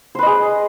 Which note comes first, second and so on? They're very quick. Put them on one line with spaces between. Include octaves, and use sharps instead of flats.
C5 B4 D#5 G#4